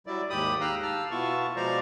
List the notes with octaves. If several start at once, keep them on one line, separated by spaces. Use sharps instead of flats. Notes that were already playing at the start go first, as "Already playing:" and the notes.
F#3 G3 E4 D5
D#2 G#2 G4 B5 D#6
F5 G5 A#5 E6 F#6
F5 A5 E6 F6
B2 B3 E4 F4 A5 C#6
B2 F3 G#3 C5 D5 A#5